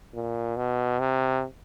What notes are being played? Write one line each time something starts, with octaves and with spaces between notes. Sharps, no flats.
A#2
B2
C3